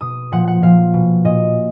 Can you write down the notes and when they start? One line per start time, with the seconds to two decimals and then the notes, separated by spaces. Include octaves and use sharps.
0.01 B2 D#6
0.32 A#2 F3 F#5
0.48 F#5
0.62 A#2 F3 F5
0.94 B2
1.25 A#2 D#5